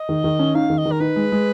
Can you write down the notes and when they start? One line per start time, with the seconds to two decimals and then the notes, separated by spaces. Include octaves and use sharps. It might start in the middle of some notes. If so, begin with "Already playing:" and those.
Already playing: D#5
0.09 D#3
0.24 D#3
0.39 C#4
0.55 D#4 F5
0.70 D#3
0.78 D#5
0.85 D#3
0.92 A#4
1.00 D#4 B4
1.16 G#3
1.32 G#3